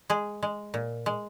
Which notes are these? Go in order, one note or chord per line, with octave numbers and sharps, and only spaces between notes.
G#3 G#4
G#3
A#2
G#3